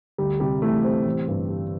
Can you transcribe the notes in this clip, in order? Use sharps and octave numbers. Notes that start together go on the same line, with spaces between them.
D2 G3
C3 G3
E3 A3
G3 C4
A1
G2
G3